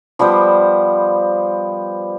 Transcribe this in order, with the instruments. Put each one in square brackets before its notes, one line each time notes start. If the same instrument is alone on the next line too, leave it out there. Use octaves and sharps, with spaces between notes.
[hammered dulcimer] F3 G3 B3 C5